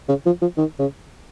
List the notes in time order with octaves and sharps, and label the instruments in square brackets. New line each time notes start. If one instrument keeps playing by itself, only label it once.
[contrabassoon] C#3
F3
F3
D#3
C#3